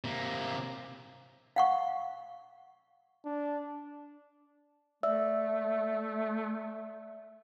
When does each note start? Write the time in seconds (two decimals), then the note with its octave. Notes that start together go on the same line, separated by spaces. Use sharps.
0.04 C3 A#3
1.56 F5 F#5 C#6
3.25 D4
5.03 A3 D5 E5 E6